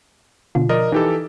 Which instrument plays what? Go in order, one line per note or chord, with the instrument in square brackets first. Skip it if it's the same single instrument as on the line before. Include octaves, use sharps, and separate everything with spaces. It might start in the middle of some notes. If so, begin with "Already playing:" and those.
[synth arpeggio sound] B2 D3 F4
[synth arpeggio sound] F3 [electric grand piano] A#4 D5 D#5
[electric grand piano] E3 G4 A4 [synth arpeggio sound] D#4